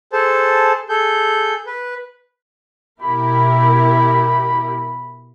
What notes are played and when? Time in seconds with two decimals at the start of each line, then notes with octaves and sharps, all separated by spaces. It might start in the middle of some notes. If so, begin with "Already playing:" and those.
0.12 G#4 A4 C5 A5
0.89 G#4 A4 G6
1.67 B4
3.02 B2 E4 G4 A#4 B5